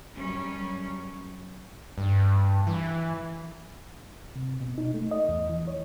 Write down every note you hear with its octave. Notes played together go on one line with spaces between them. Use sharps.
F#2 G3 C#4
G2
E3
C3
B2
D#4
A3
D#5
E2
E3
C#5